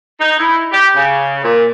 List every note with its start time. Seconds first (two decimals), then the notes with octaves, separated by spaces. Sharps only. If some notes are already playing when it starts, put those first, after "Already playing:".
0.20 D#4
0.38 E4
0.72 G4
0.95 C#3
1.43 A#2